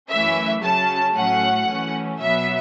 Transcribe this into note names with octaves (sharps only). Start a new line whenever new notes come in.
F#2 E3 A3 C#4 E5
C#3 F#3 C#4 A5
A2 F#3 A3 C#4 F#5
F#2 E3 A3 C#4
B2 F#3 B3 E5